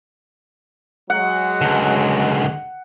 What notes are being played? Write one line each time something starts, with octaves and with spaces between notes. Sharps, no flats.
F#3 G#3 F#5
C#2 D3